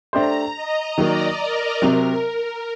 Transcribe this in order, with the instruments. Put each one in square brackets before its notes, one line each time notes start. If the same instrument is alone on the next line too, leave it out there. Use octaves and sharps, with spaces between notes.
[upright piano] A3 D4 G4 C5 [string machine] A#5
[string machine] D#5
[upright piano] D#3 F#3 A#3 [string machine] D5
[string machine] A#4
[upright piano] C3 F#3 C4 [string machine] A#4